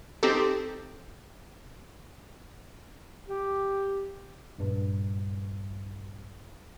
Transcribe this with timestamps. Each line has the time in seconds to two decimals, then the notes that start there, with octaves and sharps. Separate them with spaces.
0.23 C4 D#4 G4 A4
3.26 G4
4.58 A#1 G2